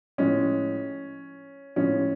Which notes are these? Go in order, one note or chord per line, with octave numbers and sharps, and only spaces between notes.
A2 F3 G#3 C#4
A2 F3 G#3 C#4